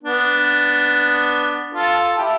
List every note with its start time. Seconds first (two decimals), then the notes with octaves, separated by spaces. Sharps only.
0.03 B3 D4
1.75 F4 A4
2.18 E4 G4